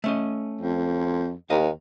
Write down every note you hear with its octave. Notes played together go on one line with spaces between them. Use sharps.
A3 C#4 D#5
F2
D#2 D#5 F5